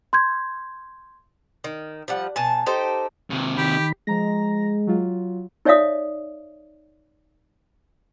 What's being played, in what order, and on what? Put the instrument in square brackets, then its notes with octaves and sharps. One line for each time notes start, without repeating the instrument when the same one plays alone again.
[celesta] C6 G6 G#6
[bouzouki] D#3
F3 G3 F#5
B2 G#5 A5
D#4 G4 A4 C5
[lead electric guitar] D#2 C3
[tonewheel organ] D#3 B5 [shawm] G4
[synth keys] F3 A#5 A#6 [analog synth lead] G#3
[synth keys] F#3 F4
[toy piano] D#4 C#5 D5 E5 F5 D#6